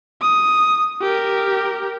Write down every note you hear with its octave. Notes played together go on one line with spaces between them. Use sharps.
D#6
G4 A#4